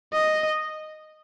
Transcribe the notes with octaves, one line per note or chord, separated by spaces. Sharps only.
D#5